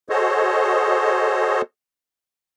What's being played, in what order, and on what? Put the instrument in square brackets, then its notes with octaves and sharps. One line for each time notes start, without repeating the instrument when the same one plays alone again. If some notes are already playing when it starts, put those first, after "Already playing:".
[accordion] F#4 G#4 A4 C5 C#5 D#5